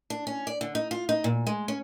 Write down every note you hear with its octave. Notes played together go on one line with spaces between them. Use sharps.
D4
C#4
D5
D3
D#4
F4
D#4
A#2
G#3
C#4